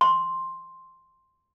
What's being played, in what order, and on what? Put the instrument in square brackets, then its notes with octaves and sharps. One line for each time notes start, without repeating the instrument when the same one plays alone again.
[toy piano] C6